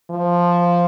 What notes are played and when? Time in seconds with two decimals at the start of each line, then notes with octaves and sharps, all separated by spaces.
0.11 F3